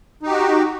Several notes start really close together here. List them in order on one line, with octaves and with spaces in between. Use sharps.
D#4 G4 F#4